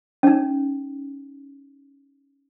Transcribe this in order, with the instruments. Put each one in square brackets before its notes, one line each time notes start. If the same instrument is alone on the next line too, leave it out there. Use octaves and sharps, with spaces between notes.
[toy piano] C#4 D#4